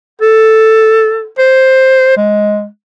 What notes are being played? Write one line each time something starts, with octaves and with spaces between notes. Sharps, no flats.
A4
C5
G#3